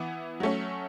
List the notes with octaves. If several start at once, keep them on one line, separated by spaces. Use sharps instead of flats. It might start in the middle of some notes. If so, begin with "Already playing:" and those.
Already playing: E3 B3 E4
F#3 A3 C#4